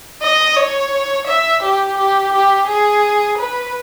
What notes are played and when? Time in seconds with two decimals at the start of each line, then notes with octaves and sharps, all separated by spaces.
0.22 D#5
0.57 C#5
1.27 E5
1.63 G4
1.98 G4
2.32 G4
2.68 G#4
3.37 B4